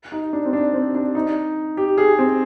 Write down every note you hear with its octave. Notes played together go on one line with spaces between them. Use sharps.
D#4
D4
C4
D4
C4
D4
D#4
G4
G#4
C4